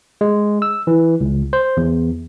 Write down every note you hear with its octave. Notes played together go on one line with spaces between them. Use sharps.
G#3
E6
E3
C#2
C5
E2